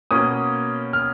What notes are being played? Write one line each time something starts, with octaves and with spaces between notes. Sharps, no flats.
B2 A#3 C#4 D#6
F6